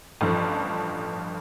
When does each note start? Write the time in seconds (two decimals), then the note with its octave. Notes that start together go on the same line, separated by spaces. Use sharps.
0.21 A1 G2 F3 A4